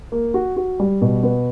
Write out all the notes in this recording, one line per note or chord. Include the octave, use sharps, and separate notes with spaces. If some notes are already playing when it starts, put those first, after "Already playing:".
A#3
F#4
F#4
G3
B2
B3